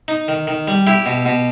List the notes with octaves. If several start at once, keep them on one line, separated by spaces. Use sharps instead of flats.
D#4
D#3
D#3
G3
E4 G4
B2
B2